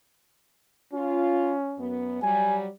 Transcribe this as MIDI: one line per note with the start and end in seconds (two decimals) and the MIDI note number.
0.93 1.83 61
0.93 1.53 65
1.79 2.22 42
1.79 2.22 59
2.22 2.69 54
2.22 2.69 55
2.22 2.58 80